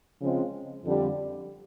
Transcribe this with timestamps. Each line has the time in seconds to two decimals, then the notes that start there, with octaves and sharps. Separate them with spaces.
0.20 C#3 F3 G#3 C4
0.85 F2 D3 G3